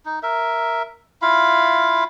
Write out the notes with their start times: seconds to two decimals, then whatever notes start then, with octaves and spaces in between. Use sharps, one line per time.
0.05 D#4
0.23 A#4 E5
1.22 E4 F4 F5 B5